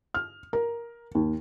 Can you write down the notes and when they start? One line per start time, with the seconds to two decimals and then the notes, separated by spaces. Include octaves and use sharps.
0.14 F6
0.53 A#4
1.15 D#2